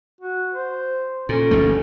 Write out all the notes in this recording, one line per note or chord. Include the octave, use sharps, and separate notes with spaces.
F#4
C5
A#2 C#4 A4
G1 D2 A3